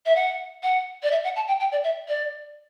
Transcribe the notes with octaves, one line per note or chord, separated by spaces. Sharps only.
E5
F#5
F#5
D5
E5
F#5
A5
G5
G5
D5
E5
D5